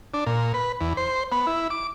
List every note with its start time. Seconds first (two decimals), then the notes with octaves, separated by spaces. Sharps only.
0.14 D4
0.26 A#2
0.54 B4
0.81 E2
0.97 C5
1.32 B3
1.47 E4
1.70 D6